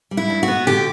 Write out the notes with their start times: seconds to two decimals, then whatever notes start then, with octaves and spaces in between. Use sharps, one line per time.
0.11 G3
0.17 E4
0.30 G2
0.43 F#4
0.48 B3
0.67 D3 G4